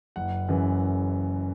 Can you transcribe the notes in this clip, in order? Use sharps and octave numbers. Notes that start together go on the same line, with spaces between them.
F#1 F#5
F#2 C#3 E3